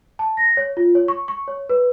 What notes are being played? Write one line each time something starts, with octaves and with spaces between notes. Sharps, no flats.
A5
A#6
C#5
F4
C#5
C#6
C#6
C#5
B4